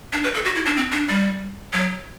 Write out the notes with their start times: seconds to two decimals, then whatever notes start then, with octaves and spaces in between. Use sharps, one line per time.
0.13 D4
0.24 B4
0.34 A4
0.45 F#4
0.55 E4
0.66 D4
0.77 C4
0.92 D4
1.09 G3
1.73 F#3